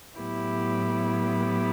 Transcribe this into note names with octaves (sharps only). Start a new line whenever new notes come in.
A2 F#3 B3 E4 G4